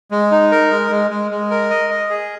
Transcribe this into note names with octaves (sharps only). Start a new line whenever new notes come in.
G#3
D#4
A#4
G#3
G#3
G#3
G#3
A#4
D#5
D#5
G#4